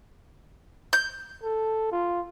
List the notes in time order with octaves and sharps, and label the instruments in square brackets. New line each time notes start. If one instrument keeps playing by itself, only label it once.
[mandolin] G6
[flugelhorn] A4
F4